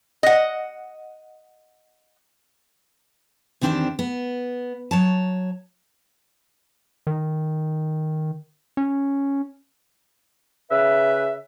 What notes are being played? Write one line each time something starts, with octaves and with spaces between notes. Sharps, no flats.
D#5 F#5
E2 D#3 C4 D4 G4 E5
B3
F#3 C#5 A5
D#3
C#4
C#3 B4 E5